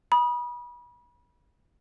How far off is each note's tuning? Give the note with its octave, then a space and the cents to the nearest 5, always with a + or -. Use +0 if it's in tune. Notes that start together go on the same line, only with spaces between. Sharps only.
B5 -35 D#6 -10